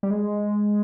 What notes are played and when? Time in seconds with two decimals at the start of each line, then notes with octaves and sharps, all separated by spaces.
0.03 G3
0.11 G#3